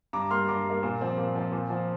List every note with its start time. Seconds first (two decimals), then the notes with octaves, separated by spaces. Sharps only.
0.13 G2 A#5 D6
0.31 G3 A#3 C6 F6
0.48 G2 A#5 D6
0.65 G3 A#3
0.83 A#2
1.01 F3 C4
1.18 A#2
1.35 F3 C4
1.52 A#2
1.70 F3 C4